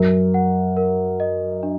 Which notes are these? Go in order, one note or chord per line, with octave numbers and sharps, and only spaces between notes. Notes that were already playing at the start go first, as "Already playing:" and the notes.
Already playing: F#2 A#4
F#5
A#4
D#5
D4